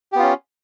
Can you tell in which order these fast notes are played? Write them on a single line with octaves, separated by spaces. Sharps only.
G4 B3 F4 C#4